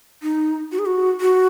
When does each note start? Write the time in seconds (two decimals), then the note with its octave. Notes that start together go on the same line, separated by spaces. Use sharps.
0.23 D#4
0.72 F#4
0.79 G#4
0.86 F#4
1.21 F#4